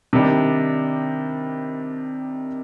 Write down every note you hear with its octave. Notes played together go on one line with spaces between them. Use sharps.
C3 D#3 G3 D4